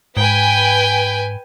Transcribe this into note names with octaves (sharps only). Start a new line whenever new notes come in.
G#2 B4 G5 G#5